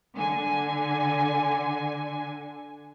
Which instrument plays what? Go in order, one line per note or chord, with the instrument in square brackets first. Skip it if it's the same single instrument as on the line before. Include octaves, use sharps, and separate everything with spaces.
[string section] D3 G#5